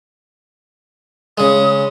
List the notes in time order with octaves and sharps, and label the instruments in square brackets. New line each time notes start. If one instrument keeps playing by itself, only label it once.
[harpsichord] C#3 G#3 [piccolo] D#6